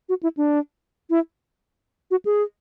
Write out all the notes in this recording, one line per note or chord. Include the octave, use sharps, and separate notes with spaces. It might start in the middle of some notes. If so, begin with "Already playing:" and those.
F#4
E4
D4
E4
F#4
G#4